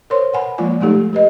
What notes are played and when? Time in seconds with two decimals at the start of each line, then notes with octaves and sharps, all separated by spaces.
0.10 A#4 C5 C#5 C6
0.33 B4 F#5 G#5 B5
0.58 F3 G#3 A#3 F4 D5 G#5
0.81 G#3 A3 D#4 G4 A4
1.13 G4 B4 D#5